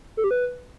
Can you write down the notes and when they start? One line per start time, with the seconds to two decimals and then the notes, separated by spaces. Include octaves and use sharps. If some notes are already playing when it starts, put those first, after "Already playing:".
0.17 A4
0.24 G4
0.31 B4